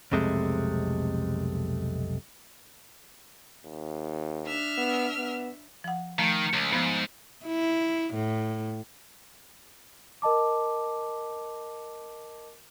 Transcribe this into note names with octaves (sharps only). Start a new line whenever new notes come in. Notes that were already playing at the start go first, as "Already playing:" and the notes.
B1 F2 C3 G#3 A3
D#2
D4 E5 F6
B3
B3
F3 F#5
D#3 F3 A3
C#2
G#2 F3 B3
E4
A2
A#4 D#5 A5 D6